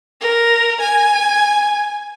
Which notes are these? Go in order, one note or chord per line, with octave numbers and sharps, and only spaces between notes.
A#4
G#5